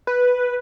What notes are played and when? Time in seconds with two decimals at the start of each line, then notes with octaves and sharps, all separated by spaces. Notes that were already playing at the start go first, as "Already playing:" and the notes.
0.07 B4